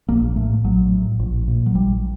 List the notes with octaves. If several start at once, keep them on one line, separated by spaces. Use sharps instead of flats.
A#1 A#3
A2 A3
A#1 F#3
A2
A#1
A#2
F#3
A#1 G3